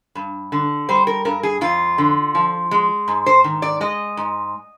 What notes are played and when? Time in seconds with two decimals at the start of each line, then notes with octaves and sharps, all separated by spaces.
0.15 G2
0.52 D3
0.89 G3 C5
1.07 A#4
1.25 G2 A#4
1.43 G#4
1.61 F2 F4
1.98 D3
2.35 F3
2.71 G#3
3.08 G#2
3.26 C5
3.44 D#3
3.62 D5
3.81 G#3 D#5
4.17 G#2